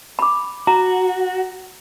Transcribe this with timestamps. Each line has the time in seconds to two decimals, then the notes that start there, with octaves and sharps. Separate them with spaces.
0.19 B5 D6
0.67 F#4 A#5